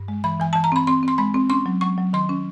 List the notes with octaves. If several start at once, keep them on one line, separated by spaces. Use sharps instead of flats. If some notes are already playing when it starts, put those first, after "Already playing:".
Already playing: G2
G#3
E3 B5
E3 G#5
E3 A5
A#5
C4 B5
C4 C6
C4 C6
G#3 B5
C4
C#4 C6
F#3
F#3 C#6
F#3
D#3 C6
C#4